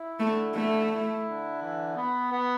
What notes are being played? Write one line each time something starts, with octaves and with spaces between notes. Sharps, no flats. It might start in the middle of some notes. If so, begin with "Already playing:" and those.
Already playing: E4
D3 A3
A3 E4
E4
D3
E3
B3
B3